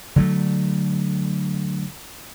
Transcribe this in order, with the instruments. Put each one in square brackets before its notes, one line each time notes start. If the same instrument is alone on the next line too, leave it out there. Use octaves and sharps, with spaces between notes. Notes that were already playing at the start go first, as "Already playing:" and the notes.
[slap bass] D3 F#3 A3